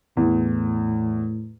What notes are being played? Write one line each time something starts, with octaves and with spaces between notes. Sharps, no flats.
E2 A2